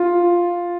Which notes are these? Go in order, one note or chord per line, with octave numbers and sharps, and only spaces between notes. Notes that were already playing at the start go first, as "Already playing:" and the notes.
Already playing: F4